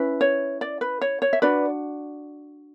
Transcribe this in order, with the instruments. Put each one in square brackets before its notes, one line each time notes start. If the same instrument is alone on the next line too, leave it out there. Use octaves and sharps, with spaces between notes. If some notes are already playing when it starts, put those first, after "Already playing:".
Already playing: [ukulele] C#4 E4 B4
C#5
D5
B4
C#5
C#5
E5
D4 F#4 B4 D5